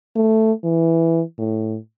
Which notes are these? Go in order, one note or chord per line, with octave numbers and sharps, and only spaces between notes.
A3
E3
A2